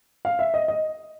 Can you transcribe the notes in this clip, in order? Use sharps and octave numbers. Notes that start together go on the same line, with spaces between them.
F5
E5
D#5
D#5